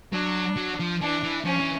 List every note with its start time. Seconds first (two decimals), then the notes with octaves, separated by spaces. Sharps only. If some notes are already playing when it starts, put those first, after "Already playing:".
0.13 F#3 D4
0.57 F#3
0.79 F3
1.01 E3 D4
1.23 E3
1.45 F3 C#4
1.60 E3